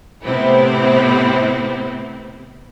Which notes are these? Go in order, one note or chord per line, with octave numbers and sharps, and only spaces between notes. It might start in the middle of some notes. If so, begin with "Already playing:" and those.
A2 C3 B3 C4 E4